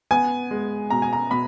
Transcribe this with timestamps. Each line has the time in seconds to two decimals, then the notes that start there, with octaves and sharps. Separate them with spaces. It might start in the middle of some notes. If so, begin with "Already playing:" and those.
0.11 B3 G#5
0.51 G#3
0.90 B2 A#5
1.02 G#5
1.13 A#5
1.31 B2 B5